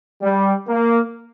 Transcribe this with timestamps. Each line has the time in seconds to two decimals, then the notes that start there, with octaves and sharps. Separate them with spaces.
0.22 G3
0.68 A#3